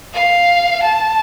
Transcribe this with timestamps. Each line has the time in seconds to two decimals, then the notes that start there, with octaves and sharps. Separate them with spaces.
0.13 F5
0.82 A5